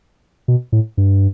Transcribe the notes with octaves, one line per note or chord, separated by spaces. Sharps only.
B2
A2
G2